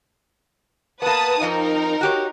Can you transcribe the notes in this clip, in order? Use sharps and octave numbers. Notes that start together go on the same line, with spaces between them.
A#3 B3 B4 A5 D#6
F2 F3 C4 D#4 A#4
F#4 G4 C#5